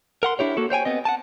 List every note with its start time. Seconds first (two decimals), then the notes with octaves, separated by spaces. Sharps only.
0.23 A#4 F#5 C6
0.39 D4 E4 G4 C#5
0.57 A#3 F#4 A4
0.70 C5 C#5 G5 G#5
0.85 B3 C4 D#5
1.05 F#5 G#5 A5